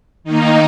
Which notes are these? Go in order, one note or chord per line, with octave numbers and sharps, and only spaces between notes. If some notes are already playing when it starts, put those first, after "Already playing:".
D#3 A#3 D#4